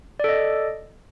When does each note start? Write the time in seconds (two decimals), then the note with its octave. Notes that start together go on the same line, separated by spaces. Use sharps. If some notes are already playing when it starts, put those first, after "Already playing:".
0.20 D5
0.24 A4
0.29 D#5